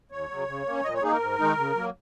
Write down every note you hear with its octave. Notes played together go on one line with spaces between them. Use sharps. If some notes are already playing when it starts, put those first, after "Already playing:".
D#2 C#5
C#3 F#3
C#3
A#3 C#4
A#2 D#5
C#5
A#3 D#4 G#4
A#4
G#2
D#3 G#3 D#4
C#3
F#3 A#3